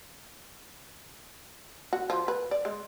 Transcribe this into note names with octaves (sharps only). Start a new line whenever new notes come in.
F#4
F3
B4
D5
G#3